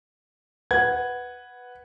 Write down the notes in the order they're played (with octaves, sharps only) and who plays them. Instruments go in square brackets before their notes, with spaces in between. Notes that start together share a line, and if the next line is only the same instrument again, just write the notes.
[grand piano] B4 F#5 G#6